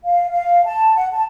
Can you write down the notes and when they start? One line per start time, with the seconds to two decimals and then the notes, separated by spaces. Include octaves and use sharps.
0.04 F5
0.31 F5
0.65 A5
0.96 F#5
1.12 A5